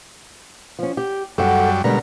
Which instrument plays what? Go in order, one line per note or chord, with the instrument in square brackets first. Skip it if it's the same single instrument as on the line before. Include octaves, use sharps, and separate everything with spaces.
[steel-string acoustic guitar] F3 C#4
G4
[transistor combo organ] F#2 G3 [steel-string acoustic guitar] A4 F#5
[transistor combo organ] B2 A#4 [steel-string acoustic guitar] D3 G3 G#3